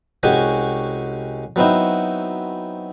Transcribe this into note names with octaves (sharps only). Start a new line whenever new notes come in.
C2 G#3 C#4 F#4 G4 G#5
F#3 B3 C4 D#4 E4